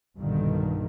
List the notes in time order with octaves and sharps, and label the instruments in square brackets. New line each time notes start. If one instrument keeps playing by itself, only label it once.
[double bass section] B1 G2 A#2 D3 D#3